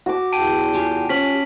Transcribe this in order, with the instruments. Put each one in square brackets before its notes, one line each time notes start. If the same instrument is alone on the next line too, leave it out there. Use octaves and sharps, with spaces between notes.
[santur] F#4 D6
[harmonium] E2 G5 [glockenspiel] A5 D7 D#7
[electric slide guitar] F4 G4 G#5
[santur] C#4 [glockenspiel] B6 F#7